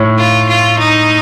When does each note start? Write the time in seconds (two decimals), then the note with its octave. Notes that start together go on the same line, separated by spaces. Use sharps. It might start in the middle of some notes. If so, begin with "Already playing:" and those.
Already playing: A2
0.18 F4
0.48 F4
0.79 D#4